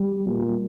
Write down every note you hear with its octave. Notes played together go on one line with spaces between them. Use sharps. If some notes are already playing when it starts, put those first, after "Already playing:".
Already playing: G3
A#2